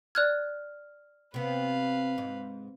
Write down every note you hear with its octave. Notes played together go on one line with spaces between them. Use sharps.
D5 F6 F#6 G#6
C3 B3 B4 F5
G#2